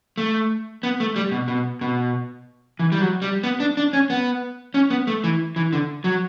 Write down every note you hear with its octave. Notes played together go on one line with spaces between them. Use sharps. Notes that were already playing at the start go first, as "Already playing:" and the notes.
A3
B3
A3
G3
B2
B2
B2
E3
G3
F#3
G3
B3
D4
D4
C#4
B3
C#4
B3
A3
E3
E3
D3
F#3